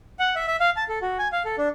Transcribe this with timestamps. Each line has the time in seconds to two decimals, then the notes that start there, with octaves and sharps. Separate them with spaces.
0.19 F#5
0.36 E5
0.47 E5
0.60 F5
0.76 A5
0.89 A4
1.02 F#4
1.19 G#5
1.32 F5
1.45 A4
1.58 D4